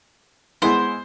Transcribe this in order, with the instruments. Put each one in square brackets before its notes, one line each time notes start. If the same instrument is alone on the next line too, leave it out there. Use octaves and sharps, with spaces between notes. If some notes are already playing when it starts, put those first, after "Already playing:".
[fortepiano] G#3 B3 E4 [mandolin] C5